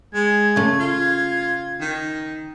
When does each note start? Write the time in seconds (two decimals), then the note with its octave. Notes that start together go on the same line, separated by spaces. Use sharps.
0.14 G#3 G#6
0.56 C#3 A3
0.80 F4
1.80 D#3